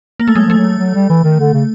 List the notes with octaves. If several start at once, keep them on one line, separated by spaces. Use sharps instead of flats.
A#3
A3
F#3 G#3
F3 A3
F#3
F#3
G3
E3
D#3
D3
C#3